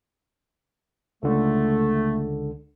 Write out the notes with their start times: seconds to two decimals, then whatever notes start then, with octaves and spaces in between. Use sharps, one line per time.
1.23 C#2 D3 A3